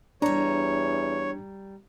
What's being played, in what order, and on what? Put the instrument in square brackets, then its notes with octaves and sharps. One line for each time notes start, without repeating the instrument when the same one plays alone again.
[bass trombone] E2 [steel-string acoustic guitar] G3 A#5 [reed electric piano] D4 [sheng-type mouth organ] C#5